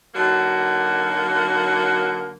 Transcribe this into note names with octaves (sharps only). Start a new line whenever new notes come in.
D3 F#3 A#3 D#4 F#4